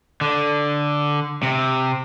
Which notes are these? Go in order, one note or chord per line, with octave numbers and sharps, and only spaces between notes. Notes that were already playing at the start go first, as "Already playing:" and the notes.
D3
C3